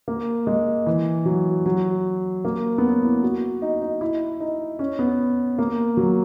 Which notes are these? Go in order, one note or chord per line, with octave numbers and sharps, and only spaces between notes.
A#3
G#3
E3
F#3
F#3
A#3
B3
C#4
E4
F#4
D#4
D#4
E4
D#4
C#4
B3
A#3
F#3